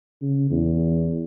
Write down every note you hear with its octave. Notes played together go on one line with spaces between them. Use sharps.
C#3
E2